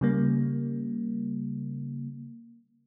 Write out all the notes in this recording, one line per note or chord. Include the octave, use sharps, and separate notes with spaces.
C#3 G3 A#3